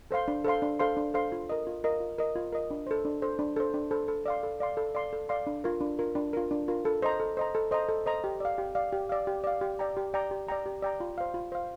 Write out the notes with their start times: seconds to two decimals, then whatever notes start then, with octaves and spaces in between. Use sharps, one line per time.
0.11 A4 C5 F5 C6
0.28 D4
0.45 A4 C5 F5 C6
0.62 D4
0.79 A4 C5 F5 C6
0.97 D4
1.14 A4 C5 F5 C6
1.32 F4
1.50 A#4 D#5
1.67 F4
1.84 A#4 D#5
2.00 F4
2.19 A#4 D#5
2.35 F4
2.52 A#4 D#5
2.71 D4
2.87 A4 C5
3.05 D4
3.22 A4 C5
3.39 D4
3.56 A4 C5
3.74 D4
3.91 A4 C5
4.08 A4
4.26 D5 F5 C6
4.43 A4
4.60 D5 F5 C6
4.77 A4
4.95 D5 F5 C6
5.13 A4
5.29 D5 F5 C6
5.47 D4
5.64 F4 A#4
5.81 D4
5.99 F4 A#4
6.15 D4
6.33 F4 A#4
6.51 D4
6.68 F4 A#4
6.85 A4
7.02 C5 D#5 A#5
7.20 A4
7.37 C5 D#5 A#5
7.55 A4
7.71 C5 D#5 A#5
7.89 A4
8.06 C5 D#5 A#5
8.24 G4
8.40 D5 F5
8.58 G4
8.75 D5 F5
8.93 G4
9.10 D5 F5
9.27 G4
9.44 D5 F5
9.61 G4
9.79 D5 G5 A#5
9.97 G4
10.14 D5 G5 A#5
10.31 G4
10.48 D5 G5 A#5
10.66 G4
10.82 D5 G5 A#5
11.00 F4
11.18 C5 F5
11.34 F4
11.52 C5 F5